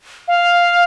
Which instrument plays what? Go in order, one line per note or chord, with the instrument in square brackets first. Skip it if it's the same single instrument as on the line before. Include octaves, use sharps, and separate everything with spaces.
[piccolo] F5